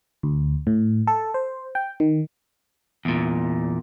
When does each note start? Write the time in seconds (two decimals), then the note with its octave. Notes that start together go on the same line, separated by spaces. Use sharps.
0.23 D2
0.67 A2
1.07 A4
1.34 C5
1.75 G5
2.00 D#3
3.05 E2 A#2